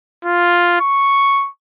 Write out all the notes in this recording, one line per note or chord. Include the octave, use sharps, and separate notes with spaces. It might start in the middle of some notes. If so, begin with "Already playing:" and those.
F4
C#6